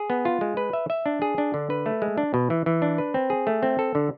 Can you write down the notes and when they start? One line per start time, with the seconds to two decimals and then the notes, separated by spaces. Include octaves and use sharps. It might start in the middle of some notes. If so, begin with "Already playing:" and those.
Already playing: G#4
0.10 B3
0.25 F4
0.41 G#3
0.57 B4
0.73 E5
0.90 E5
1.06 D4
1.22 G#4
1.38 D4
1.54 D3
1.70 B4
1.86 A3
2.02 G#3
2.18 D4
2.34 B2
2.50 E3
2.66 E3
2.82 D4
2.98 B4
3.14 C4
3.30 G#4
3.47 A3
3.63 C4
3.79 A4
3.95 D3